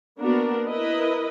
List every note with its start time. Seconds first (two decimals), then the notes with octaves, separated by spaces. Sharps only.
0.19 A#3 B3 D4 F#4 A#4
0.68 E4 A#4 B4 D#5